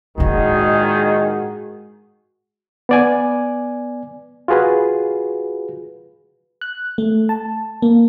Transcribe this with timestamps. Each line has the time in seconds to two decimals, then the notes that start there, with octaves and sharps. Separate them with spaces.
0.18 A#1 A2 D#3 G#3 E4 F#4 G#4
2.89 B3 D5 G#5
4.48 F4 F#4 G#4 B4
6.61 F#6
6.98 A3
7.29 A5
7.82 A#3